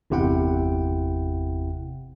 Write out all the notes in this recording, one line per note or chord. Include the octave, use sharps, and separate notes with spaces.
G1 E2 C3 E4 F#5 G5